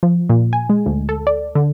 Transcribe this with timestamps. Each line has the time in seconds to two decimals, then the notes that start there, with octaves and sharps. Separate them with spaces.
0.03 F3
0.29 A#2
0.53 G#5
0.70 G#3
0.86 D2
1.09 A4
1.27 D5
1.55 D3